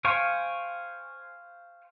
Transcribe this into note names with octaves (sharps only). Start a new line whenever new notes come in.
C5 F5 G5 G#5 C#6